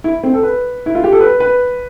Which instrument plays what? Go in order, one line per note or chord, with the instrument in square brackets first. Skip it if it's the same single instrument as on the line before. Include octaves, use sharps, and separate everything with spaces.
[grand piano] E4
C4
A4
B4
E4
F4
G4
A4
B4
B4